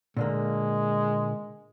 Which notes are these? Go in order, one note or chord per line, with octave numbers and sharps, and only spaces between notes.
A#2 D3 G#3 A#3